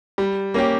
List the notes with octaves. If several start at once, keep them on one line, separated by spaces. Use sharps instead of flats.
G3
A#3 C#4 G4